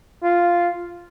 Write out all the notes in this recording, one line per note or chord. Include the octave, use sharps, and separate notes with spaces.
F4